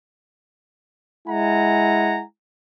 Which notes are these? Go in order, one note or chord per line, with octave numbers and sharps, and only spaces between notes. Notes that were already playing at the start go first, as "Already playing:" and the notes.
G#3 E4 F#5 G#5 A#5